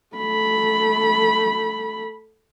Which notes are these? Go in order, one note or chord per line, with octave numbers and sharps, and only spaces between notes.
A3 B5